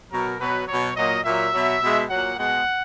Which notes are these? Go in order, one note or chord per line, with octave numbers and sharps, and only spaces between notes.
B2 F#3 A#4
B2 F#3 B4
B2 F#3 C#5
A#2 F#3 D#5
A#2 F#3 E5
B2 F#3
B2 G#3
A#2 F#3 F#5
B2 G#3 F#5